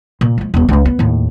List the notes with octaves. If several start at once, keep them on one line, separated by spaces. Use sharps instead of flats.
A#2
F3 G#3
D#1 B3
C#2 A3
B3
D#2 A2